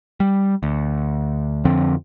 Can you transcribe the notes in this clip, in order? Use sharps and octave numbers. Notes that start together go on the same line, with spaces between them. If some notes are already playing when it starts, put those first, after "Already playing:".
G3
D2
F2 D3 F3 C4